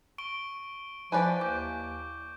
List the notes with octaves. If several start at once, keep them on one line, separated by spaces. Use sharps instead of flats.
C#6 D7 G7
E3 F3 B4 D5 G5 G#5
D#2 D6 G6